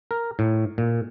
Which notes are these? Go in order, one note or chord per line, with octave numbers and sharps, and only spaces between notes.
A#4
A2
A#2